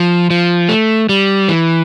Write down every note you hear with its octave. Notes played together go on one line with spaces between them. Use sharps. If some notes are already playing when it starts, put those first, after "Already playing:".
Already playing: F3
F3
A3
G3
E3